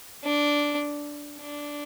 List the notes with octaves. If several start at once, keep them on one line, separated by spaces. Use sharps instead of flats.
D4
D4